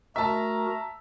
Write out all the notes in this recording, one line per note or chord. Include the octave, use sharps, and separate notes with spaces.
A3 F#4 A#4 E5 A5 A#5